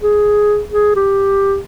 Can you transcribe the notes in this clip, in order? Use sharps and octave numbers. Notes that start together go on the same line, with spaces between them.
G#4
G#4
G4